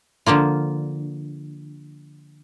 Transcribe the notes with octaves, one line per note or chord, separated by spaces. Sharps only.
D3 F3 A#3 F4